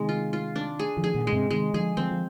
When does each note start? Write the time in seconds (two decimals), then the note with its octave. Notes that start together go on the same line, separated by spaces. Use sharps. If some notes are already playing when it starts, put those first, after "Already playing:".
Already playing: C3 D#3 G#3
0.09 F4
0.33 F4
0.56 D4
0.79 G#4
0.97 D3 F3
1.04 G#4
1.15 A#2 D3
1.26 D3 G#3
1.32 G#2 C3
1.50 C3 D#3 G#3
1.74 D3 F3 G#4
1.97 D3 F3 C4
2.11 F3